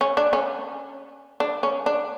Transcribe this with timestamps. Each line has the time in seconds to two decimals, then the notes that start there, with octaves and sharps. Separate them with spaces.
0.01 C#4
0.17 D4
0.33 C#4
1.40 D4
1.63 C#4
1.86 D4